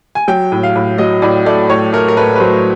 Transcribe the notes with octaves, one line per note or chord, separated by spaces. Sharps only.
G#5
F#3 G5
A2
F5
A2
F#3 D#5
A2 D5
A3 D5
A2 C#5
A3 A#4
A#4
A3 B4
B4
F#3 C5